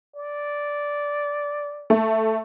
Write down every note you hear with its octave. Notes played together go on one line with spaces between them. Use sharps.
D5
A3